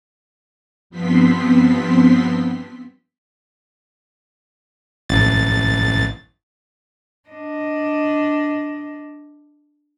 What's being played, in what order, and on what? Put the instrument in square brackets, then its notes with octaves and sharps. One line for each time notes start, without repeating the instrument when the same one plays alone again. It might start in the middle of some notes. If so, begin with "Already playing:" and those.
[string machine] G2 F3 B3 C4 C6 B6
[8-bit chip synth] A1 A6
[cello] D4 D#5